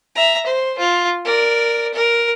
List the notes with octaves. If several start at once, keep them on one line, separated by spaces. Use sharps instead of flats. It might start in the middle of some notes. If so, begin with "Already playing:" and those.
E5 A#5
C5
F4
A#4 D5
A#4